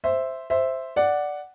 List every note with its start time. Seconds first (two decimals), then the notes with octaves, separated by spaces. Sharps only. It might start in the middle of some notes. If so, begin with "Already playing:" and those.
0.04 C5 E5
0.50 C5 E5
0.96 D5 F#5